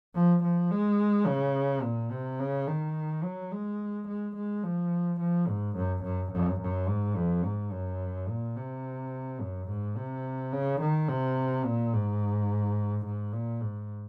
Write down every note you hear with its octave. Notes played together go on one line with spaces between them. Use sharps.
F3
F3
G#3
C#3
A#2
C3
C#3
D#3
F#3
G#3
G#3
G#3
F3
F3
G#2
F#2
F#2
F#2
F#2
G#2
F2
G#2
F#2
A#2
C3
F#2
G#2
C3
C#3
D#3
C3
A#2
G#2
G#2
A#2
G#2